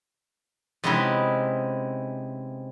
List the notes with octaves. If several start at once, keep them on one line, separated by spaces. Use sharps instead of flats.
C3 G#3 B3 C#4 D#4 E4